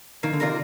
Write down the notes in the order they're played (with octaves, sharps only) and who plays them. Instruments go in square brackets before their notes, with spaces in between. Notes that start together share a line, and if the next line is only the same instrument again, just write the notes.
[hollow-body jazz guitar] D#3 [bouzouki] A#3
[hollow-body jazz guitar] D3
[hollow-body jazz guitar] C3 D#3 [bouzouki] F4 A#4 D5